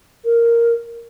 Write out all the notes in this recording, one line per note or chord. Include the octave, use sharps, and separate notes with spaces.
A#4